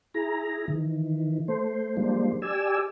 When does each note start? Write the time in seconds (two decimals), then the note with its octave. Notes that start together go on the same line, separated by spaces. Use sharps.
0.14 E4 G#4 A#5
0.68 D#3 E3
1.48 A3 C5
1.97 F3 G3 G#3 A#3 D4 C5
2.42 G4 D5 G#5 E6